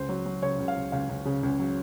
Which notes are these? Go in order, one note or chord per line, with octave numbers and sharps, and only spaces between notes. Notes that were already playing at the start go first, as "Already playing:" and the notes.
Already playing: C#2 C5
F#3
F#3
C#3 C#5
C#2
F5
C#2
C#2 F5
C#2
C#3
C#2
F#3